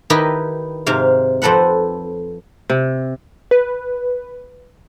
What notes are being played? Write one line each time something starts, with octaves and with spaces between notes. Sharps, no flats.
D#3 D#4 E4 G4 B4 D#5
G#2 C3 F5
F2 C4 A4 B4 F#5
C3
B4